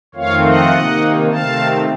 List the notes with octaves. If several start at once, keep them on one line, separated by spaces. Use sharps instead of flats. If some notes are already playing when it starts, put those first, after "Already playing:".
F2 D#3 A3 C4 F4 C#5 F5
D#5 F#5
C3 D#3 A#3 D#4
C3 D#3 A3 C4 F5 A5